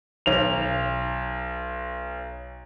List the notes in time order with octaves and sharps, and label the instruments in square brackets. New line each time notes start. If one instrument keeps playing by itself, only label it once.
[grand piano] B1 F7